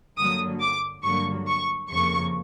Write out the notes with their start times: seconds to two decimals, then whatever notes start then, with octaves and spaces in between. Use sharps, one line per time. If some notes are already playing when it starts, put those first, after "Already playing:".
0.17 G2 D3 F#3 A#3 D#6
0.61 D6
1.04 G2 D3 F#3 A#3 C#6
1.47 C#6
1.90 F2 C#3 F3 A#3 C#6